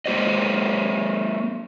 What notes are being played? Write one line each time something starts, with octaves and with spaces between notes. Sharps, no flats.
G#3 A#3 G4 C5 D#5